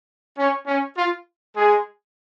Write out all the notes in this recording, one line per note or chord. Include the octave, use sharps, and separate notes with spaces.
C#4
C#4
F4
G#3 G#4